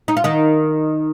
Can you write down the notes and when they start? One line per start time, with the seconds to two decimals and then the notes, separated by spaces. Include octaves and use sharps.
0.08 D#4
0.17 F4
0.24 D#3 D#4